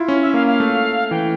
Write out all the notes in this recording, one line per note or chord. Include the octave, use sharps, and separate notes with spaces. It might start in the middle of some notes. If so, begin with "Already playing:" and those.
Already playing: E4 F4
C#4
E5
A#3 F5
F5
A3
E3 G5